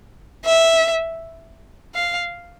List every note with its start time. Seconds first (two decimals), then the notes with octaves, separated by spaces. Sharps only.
0.45 E5
1.94 F5